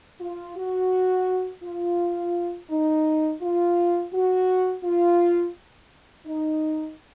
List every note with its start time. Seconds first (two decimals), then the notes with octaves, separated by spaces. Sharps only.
0.20 F4
0.56 F#4
1.63 F4
2.70 D#4
3.41 F4
4.12 F#4
4.83 F4
6.26 D#4